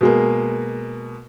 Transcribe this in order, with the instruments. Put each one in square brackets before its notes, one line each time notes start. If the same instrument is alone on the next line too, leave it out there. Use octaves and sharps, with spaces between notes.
[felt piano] B2 G#3 A#3